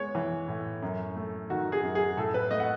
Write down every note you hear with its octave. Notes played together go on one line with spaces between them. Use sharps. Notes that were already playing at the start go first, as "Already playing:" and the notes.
Already playing: G#3 B3 C#5
E3
A2
F#2
A3
D#3 F#4
G#4
F#2
G#4
A2 A4
B4
A3 D#5
F#5